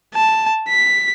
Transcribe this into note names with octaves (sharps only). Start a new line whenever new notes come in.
A5
B6